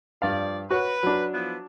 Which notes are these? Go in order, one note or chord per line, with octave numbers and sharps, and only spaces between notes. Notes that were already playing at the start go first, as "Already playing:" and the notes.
G2 F3 D5 F5
F#4 B4 C#5
F#3 D4
F3 B3 E4